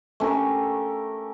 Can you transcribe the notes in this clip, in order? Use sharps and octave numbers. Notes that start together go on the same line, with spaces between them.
A3 C#4 G4 A#4